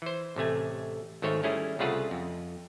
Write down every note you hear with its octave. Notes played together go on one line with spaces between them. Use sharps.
E3 C5
A1 C3 A3 G#5
G#1 D#3 A3 C5 C#5
G3 A3 C#4 E4 G#4
C2 C#3 A3 F4 G#4 F#5
F2